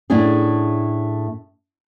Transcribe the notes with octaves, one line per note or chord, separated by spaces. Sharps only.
A2 A3 C#4 D4 E4 G#4